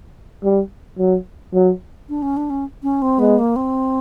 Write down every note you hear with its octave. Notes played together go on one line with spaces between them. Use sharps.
G3
F#3
F#3
D4
C#4
D4
C#4
C#4
C4
G#3 B3
A#3
C4